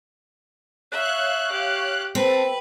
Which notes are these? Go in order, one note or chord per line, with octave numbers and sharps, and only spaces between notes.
C#5 E5 F5 F#6
G4
C4 A4 B4